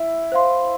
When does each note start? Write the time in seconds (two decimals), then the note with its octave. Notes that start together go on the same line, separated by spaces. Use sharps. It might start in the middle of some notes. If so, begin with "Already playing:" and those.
Already playing: E4
0.32 C5 F5 C6